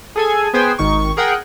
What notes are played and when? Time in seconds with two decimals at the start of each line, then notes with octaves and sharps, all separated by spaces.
0.16 G#4 A4 G#5
0.53 B3 G#4 C5 G5 G#5
0.78 G#1 D#3 C#6
1.17 G#4 A#4 F#5 G5